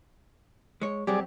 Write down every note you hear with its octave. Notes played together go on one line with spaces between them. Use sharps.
G#3 C#5
F#3 G3 C4 G4 G#4 D5